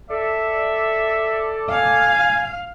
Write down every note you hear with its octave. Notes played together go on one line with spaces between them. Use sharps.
A4 D5 E5
F5 G#5